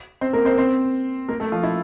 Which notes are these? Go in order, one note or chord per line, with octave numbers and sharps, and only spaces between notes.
C4 C5
A#3 A#4
C4 C5
C4 C5
A#3 A#4
A3 A4
F3 F4
E4